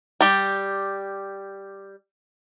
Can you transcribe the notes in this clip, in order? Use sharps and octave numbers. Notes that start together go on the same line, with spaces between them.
G3 G4